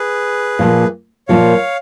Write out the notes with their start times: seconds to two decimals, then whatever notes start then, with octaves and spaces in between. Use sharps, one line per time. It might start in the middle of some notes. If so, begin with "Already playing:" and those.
Already playing: G#4 B4
0.59 A#2 F3 A#3
1.28 A#2 F3 A#3 C#5 F5